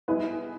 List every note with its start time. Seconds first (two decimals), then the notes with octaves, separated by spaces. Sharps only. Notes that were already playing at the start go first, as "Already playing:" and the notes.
0.08 G3 B3 D#4 E4 G#4 B4